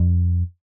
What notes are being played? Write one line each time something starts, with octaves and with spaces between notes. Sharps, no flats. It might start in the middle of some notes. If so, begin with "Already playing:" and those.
Already playing: F2